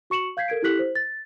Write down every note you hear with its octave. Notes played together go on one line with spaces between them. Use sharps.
F#4 C#6 C#7 E7 F#7
F5 G6 G#6 B6 C7
A4 A#4 G#6 D7
E4 G4 A4 F#6 B6 F#7
C5
A6